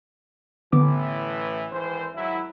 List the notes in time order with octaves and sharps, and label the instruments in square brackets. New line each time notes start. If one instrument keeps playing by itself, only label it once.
[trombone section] A1 A2 E3 [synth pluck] D3 B3 D6
[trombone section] G#1 E3 C5
G#1 F#3 E4